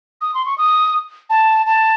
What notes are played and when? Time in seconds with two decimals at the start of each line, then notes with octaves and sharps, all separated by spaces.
0.21 D#6
0.34 C6
0.46 C#6
0.58 D#6
1.30 A5
1.66 A5